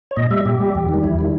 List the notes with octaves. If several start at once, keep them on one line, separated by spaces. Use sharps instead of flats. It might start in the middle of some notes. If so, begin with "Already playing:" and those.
C#5
A#2 D#5
G3 E5
A#2 G4
G3
E2
D#3
G3
E2 E4
D#3 G3